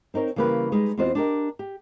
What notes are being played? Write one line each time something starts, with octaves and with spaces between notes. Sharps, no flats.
C4 D#4 A#4 C#5
C#3 E3 G3 A#3 G4 B4
G3 G#3 D#4 B4
E2 C4 F4 F#4 C5 D#5
D4 G4 A#4 D#5
G4